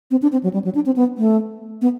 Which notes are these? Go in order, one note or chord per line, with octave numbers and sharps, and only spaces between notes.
C4
D4
C4
F#3
G3
F#3
D4
C4
B3
A3
B3